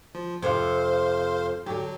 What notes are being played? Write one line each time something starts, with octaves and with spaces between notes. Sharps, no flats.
F3
F2 C3 F4 C5 F5
D3 F#3 G4